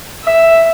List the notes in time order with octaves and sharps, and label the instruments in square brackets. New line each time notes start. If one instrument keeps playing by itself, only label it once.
[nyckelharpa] E5